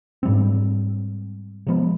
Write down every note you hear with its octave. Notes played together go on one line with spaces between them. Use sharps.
G#2 G3 C4
C3 F3 G#3 B3